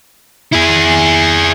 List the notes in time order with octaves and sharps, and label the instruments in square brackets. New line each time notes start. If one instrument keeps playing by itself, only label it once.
[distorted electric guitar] E4 G#4